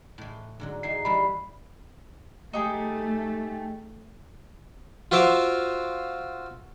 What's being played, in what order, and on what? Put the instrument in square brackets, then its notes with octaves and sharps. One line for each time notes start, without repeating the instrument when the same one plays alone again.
[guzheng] A2 E3
G#2 D3 F#3
[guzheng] E3 D#4 G#4 [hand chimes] C7
[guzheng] D#3 E3 G3 [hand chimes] B5
[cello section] A3 [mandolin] D#4 G4 G#4
[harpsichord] F4 F#4 C5 E5 F5 D6